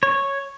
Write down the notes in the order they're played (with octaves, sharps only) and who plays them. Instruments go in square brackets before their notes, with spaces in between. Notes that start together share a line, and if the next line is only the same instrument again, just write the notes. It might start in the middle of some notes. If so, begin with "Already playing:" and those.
[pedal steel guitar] C#5